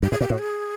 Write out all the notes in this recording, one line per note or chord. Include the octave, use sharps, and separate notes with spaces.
G2 G4
A2 G#4
A#2 G4
A2 F#4
G#4